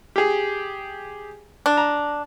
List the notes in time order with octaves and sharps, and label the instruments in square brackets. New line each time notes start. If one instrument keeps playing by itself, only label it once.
[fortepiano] G4 G#4
[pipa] D4
[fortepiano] A#5